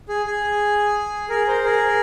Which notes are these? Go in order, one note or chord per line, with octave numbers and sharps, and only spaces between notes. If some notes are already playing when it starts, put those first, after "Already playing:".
G#4
G#4
G#4 A#4
A#4 C5
G#4 A#4